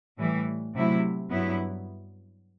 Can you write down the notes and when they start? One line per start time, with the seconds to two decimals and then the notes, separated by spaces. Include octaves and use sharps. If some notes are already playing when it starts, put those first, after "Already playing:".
0.18 A2 E3 G3
0.74 C3 F#3 A3 E4
1.31 G2 F#3 B3 E4